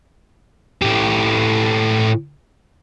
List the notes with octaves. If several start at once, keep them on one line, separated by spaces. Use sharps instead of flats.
A2 G4